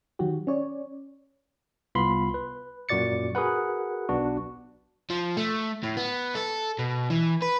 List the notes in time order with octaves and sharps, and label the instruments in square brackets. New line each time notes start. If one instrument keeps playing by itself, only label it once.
[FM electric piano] D#3 F#3 F#4 G4
C#4 C#5 D5
[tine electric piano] C2 B3 F4 B5 C6
B4
F#2 A#2 F#4 D5 A6 C#7
F#4 G#4 A#4 B4 F#5
B1 B3 D4 F#4
[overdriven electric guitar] F3
A3
A2
B3
A4
B2
E3
B4